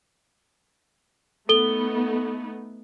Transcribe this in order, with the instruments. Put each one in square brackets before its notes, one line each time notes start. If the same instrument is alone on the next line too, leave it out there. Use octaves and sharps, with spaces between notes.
[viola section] A3 B3 D#4 [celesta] A4 G7